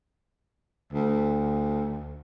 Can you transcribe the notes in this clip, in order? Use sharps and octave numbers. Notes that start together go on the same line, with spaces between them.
D2